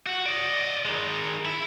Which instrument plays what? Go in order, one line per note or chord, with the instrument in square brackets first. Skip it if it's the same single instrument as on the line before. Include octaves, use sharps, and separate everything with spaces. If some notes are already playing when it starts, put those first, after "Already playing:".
[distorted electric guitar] F#4 F#5
D5 D#5
D#3 G#3
E4